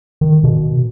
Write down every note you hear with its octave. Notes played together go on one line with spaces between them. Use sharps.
D#3
B2